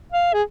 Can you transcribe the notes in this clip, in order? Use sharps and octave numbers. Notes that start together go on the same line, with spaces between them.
F5
G#4